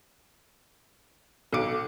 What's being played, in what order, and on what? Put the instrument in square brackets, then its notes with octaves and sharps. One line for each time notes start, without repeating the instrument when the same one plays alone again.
[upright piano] B1 C#7 D7 [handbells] A4 D6